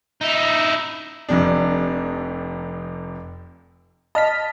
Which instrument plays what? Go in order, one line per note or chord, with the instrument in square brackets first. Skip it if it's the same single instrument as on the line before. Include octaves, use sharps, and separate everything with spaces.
[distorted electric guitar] D#4 E4
[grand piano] F1 F2 C3 D4
[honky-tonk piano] D#5 [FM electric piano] A5 F6 B6